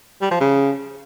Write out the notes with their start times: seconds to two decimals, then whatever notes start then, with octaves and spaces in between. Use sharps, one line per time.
0.22 G3
0.31 F3
0.40 C#3